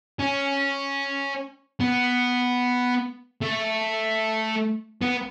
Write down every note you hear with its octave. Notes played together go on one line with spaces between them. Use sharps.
C#4
B3
A3
B3